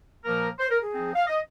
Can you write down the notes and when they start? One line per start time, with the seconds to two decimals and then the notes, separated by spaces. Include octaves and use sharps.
0.24 A#2 F3 A#3 A#4
0.59 C5
0.70 A#4
0.82 G#4
0.93 F3 C4 D#4
1.16 F5
1.27 D#5